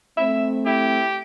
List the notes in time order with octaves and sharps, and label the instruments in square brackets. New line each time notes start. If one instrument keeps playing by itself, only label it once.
[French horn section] A3 C4 [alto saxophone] E5
[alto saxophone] E4 [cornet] G4